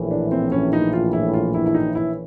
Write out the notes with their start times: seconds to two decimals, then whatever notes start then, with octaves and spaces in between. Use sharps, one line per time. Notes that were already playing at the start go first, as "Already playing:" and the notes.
Already playing: A#1 A2 E3
0.11 D4
0.32 C4
0.52 C#4
0.73 D#4
0.93 F4
1.13 E4
1.34 F4
1.54 E4
1.66 E4
1.74 D#4
1.95 E4